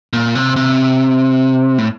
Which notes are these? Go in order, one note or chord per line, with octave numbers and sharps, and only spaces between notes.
A#2
C3
C3
A2